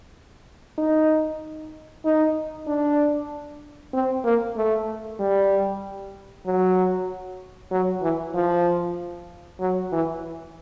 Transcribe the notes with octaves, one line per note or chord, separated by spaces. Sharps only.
D#4
D#4
D4
C4
A#3
A3
G3
F#3
F#3
E3
F3
F#3
E3